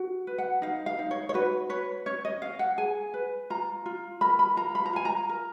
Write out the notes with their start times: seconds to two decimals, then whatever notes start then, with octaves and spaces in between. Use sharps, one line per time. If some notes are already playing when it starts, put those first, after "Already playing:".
Already playing: F#4
0.27 B4
0.38 F#5
0.62 D#4 F5
0.86 F5
0.99 D#4
1.11 C#5
1.29 C#5
1.34 F#4 B4
1.69 B4 C#5
2.06 C#4 C#5
2.25 D#5
2.41 C#4 F5
2.59 F#5
2.78 G#4 G#5
3.14 B4
3.50 F4 A#5
3.86 F4
4.21 A#4 B5
4.39 B5
4.57 F4 A#5
4.75 B5
4.86 A#5
4.93 F4 G#5
5.05 A#5
5.29 A#4